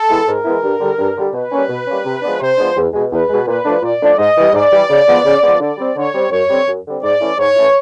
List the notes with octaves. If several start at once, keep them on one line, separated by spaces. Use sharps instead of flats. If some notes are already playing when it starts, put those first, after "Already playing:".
Already playing: A4
E3 G#3 B3 E4
G#2 A#4
E3 G#3 B3 E4
G2
D3 G3
G2
D3 G3
B2 B4
G3 A#3 C#4
B2
G3 A#3 C#4
C3
F3 G#3 B3 D4
C3 C5
F3 G#3 B3 D4
E2
B2 G#3
E2 B4
B2 G#3
A#2 B4
F3 A3 D4
A#2 D5
F3 A3 D4
G#2 D#5
E3 G3
G#2 D5
E3 G3
C#3
F3 G#3 B3
C#3
F3 G#3 B3
D3 D5
G3 C4
D3 C#5
G3 C4
F#2 C#5
D3 G3 C4
F#2
D3 G3 C4
G#2 D5
E3 A3 C#4 E4
G#2 C#5
E3 A3 C#4 E4